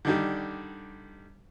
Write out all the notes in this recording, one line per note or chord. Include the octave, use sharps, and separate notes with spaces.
D3 D#3 G3